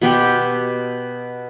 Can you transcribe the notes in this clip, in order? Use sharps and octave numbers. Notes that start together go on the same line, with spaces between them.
B2 B3 G4 C6